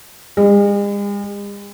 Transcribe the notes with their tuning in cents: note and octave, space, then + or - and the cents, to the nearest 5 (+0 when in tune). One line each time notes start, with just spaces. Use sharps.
G#3 -45